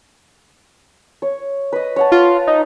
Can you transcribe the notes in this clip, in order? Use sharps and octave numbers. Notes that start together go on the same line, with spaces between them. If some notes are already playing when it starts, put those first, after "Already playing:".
C#5
B4 D#5
C#5 F#5 A5
F4 F5
D#4